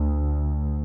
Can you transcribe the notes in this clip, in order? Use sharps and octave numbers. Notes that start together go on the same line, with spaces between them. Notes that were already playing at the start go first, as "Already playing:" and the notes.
Already playing: D2